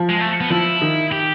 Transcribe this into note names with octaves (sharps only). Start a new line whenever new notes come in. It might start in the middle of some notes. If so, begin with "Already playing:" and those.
Already playing: F3
G#3
A3
B3
F3 E4
D#3
G4